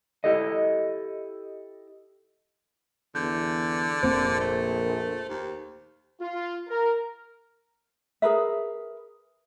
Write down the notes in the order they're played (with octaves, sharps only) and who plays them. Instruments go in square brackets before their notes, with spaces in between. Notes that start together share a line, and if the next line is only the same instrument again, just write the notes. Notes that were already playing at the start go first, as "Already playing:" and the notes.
[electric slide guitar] E4 G4 A4 D#5
[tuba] E2 [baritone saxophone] D3 [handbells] G6
[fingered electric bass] F1 A#3 C4 [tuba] A#1 [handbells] C5
[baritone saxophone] A3
D#2
[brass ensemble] F4
A#4
[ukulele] G#4 A#4 B4 E5